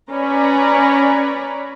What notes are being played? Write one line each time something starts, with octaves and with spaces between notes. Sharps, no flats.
C#4 B4 C#5 D5 A#5 B5